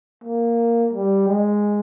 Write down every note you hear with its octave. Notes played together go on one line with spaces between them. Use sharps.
A#3
G3
G#3